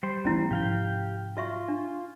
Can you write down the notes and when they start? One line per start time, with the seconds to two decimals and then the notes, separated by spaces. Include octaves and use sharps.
0.03 G3 C5
0.25 E3 A3 B3 C#4 E4
0.51 G#2 C3 F3 G4 F5 G5
1.37 F4 F#4 E5 C#6
1.68 D4